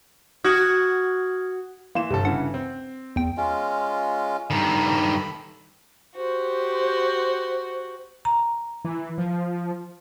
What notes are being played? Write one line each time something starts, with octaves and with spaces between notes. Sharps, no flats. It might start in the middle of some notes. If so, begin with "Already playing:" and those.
F#4 D#6 F6 G#6
E3 A#3 C6 E7
G1 C3 A4
G2 C#3 E3 F#5
C4
E2 G5
G#3 C#4 F4
G2 D#3 A4 B5
F#4 G4 C5
A#5
E3
F3